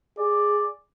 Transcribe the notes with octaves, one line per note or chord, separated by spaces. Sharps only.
G#4 D5